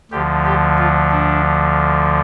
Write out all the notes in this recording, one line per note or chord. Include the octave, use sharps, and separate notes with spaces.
D2 D3 F3 G4
G4
F4
D4